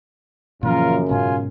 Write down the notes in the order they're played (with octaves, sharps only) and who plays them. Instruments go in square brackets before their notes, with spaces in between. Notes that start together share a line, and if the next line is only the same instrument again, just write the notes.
[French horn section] F#2 C#3 [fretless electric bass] A#2 E3 F3 [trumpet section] F4 A#4
[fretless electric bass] G#2 B2 C#4 [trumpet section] F4 G#5